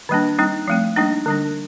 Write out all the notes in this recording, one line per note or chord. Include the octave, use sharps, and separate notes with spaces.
D#3 G3 A#3 D4
G3 C4 D#4
F3 A3 C4
G3 A#3 D4 D#4
D3 G3 D4